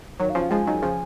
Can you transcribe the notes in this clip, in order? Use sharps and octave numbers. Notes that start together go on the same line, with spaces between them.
D#3 F#3 C#5
F5
C#3 F3
F5
F3 G#3 G#5
D#3 F#3
C#3 F3